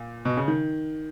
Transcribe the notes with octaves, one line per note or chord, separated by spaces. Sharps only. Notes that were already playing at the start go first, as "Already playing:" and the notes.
Already playing: A#2
B2
C#3
D#3